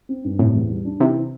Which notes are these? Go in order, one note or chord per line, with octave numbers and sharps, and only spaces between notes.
C4
G2
A2 C3
E2
G3
D4
C3 E3